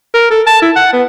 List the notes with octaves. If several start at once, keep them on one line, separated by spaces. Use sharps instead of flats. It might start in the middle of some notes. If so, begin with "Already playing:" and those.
A#4
A4
A5
E4
F#5
B3